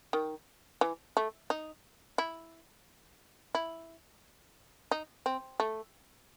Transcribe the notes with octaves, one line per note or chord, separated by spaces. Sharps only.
D#3
E3
A3
D#4
E4
E4
D#4
C4
A3